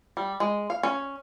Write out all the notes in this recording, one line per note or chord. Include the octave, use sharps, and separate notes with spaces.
G3
G#3
F5
C#4